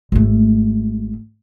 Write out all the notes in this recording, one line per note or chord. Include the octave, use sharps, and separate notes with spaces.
G#1 A3